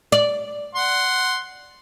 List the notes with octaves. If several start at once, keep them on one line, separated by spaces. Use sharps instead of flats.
D5
F#5 C6